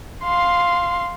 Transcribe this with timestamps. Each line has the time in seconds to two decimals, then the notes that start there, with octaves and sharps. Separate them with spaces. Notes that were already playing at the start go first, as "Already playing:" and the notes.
0.24 F5 C6